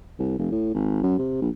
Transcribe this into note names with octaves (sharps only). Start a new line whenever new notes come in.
C2
F1
A2
G#1
F#2
C3
A#1